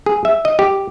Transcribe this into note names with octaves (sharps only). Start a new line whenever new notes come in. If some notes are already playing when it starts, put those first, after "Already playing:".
G#4
E5
D#5
G4